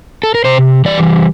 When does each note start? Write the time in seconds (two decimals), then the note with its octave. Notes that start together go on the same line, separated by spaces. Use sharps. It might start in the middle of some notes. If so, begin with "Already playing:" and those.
0.23 A4
0.35 A#4
0.45 C3 C5
0.85 E3 G3 D5